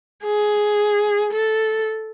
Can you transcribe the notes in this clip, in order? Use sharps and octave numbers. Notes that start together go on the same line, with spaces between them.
G#4
A4